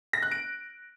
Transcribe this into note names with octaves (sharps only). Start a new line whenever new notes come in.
A#6
F#6
D7